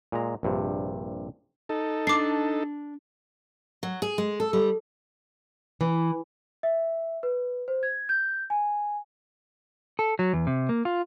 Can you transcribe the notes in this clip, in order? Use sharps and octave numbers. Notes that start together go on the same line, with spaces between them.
A#2 G#3 A#5
A#1 G2 C3
D#4 A4
D4 D6 C7
F#3
G#4
G#3
A4
G3
E3
E5
B4
C5
G#6
G6
G#5
A4
F#3
E2
C3
A#3
F4